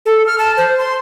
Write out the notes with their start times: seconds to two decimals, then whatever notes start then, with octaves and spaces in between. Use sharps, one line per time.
0.06 A4
0.27 F6
0.38 A5
0.57 C5
0.78 C6